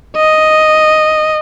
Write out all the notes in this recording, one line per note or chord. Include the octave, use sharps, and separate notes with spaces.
D#5